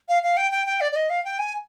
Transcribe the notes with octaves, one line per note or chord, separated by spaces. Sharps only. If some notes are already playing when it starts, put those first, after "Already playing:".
F5
F5
G5
G5
G5
D5
D5
D#5
F5
G5
G#5